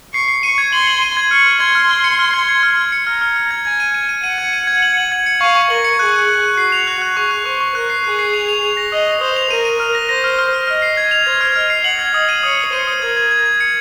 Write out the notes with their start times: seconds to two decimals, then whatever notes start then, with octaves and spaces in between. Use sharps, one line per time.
0.14 C#6 C7
0.28 C7
0.43 C#6 D#7
0.58 G#6
0.73 C6 F#7
0.87 F#7
1.02 D#7
1.17 G#6
1.31 C#6 F6
1.46 F6
1.60 C6 G#6
1.75 F6
1.89 F6
2.04 C#7
2.19 F6
2.34 G#6
2.48 G#6
2.63 F6
2.77 F6
2.92 C#7
3.07 A#5 F6
3.21 F6
3.36 F6
3.51 G#6
3.65 G#5 G#6
3.80 D#7
3.94 D#7
4.09 D#7
4.23 F#5 D#7
4.38 G#6
4.53 D#7
4.67 G#6
4.82 F#7
4.97 F#7
5.12 G#6
5.26 C#7
5.41 F5 C#6
5.55 C#6
5.70 A#4 F#7
5.84 C#7
5.99 G#4 F#6
6.14 F#6
6.29 F#6
6.43 F#6
6.58 F#4 C7
6.72 F7
6.87 F#6
7.02 F#6
7.16 G#4 C#6
7.31 F#6
7.46 C5 C#6
7.61 C#6
7.75 A#4 F#6
7.90 C7
8.04 G#4 F#6
8.19 C7
8.34 F7
8.49 F7
8.63 F7
8.77 A#6
8.92 D#5 D#6
9.07 D#6
9.21 C5 D#6
9.36 F7
9.50 A#4 D#7
9.65 D#7
9.80 F6
9.95 A#6
10.09 C5 A#6
10.24 F6
10.39 F6
10.53 F6
10.67 D#5 F6
10.82 C7
10.97 G#6
11.11 F7
11.26 C5 G#6
11.41 F6
11.56 D#5 F6
11.70 C7
11.84 F#5 F#7
11.99 G#6
12.14 D#5 D#6
12.29 D#7
12.43 C#5 D#6
12.58 D#6
12.72 C5 D#7
12.87 D#6
13.01 A#4 G#6
13.17 G#6
13.31 G#6
13.46 G#6
13.60 C#7